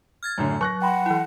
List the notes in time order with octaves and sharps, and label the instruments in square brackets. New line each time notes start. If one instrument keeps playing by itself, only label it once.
[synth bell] F6 G#6 A6
[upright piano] F#2 A2 D3
[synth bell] F#3 [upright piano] C#6 F#6 A#6
[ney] F#5 [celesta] G5 B5 C6
[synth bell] E3 E4